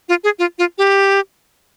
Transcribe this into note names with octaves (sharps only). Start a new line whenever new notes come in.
F4
G#4
F4
F4
G4